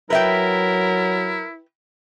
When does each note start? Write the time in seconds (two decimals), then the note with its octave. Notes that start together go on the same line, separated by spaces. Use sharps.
0.10 F#3 E4 A#4 B4 E5 G5